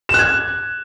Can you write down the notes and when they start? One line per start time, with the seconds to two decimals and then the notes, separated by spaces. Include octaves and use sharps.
0.09 E7
0.14 F#6
0.19 G#6